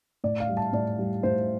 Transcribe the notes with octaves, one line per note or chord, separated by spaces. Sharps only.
A2 D5
F5
G3
A5
A2 D5
G3
A2 C5